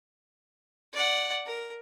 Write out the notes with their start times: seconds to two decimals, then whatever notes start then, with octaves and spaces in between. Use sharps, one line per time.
0.93 D5 F#5
1.46 A#4